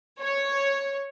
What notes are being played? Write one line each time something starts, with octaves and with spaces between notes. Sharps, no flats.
C#5